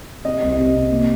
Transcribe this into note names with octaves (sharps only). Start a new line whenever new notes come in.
C3 D#5
C2
C3
C3
A#3